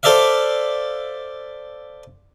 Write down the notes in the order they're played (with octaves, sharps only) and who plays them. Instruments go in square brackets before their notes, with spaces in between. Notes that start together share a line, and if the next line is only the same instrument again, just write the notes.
[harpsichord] A4 C5 D5 E5 F5